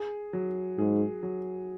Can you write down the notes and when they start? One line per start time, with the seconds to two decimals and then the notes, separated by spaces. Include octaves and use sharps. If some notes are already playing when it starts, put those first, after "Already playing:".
Already playing: G#4
0.33 F#3
0.78 G#2 G#4
1.23 F#3